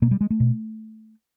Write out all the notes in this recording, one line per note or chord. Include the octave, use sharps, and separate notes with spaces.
B2 A#3
G3
G#3
A3
B2